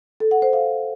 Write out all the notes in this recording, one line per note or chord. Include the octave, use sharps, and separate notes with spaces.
A4
F#5
C5
F5